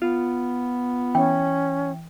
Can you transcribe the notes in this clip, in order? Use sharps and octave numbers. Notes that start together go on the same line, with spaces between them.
B3 F4
E3 C#4 G5